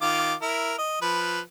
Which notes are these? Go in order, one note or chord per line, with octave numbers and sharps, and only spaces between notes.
D#3 F4 D6
E4 A#4
D#5
F3 B4